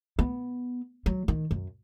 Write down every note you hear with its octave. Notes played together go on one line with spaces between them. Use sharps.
B3
F#3
D#3
F#2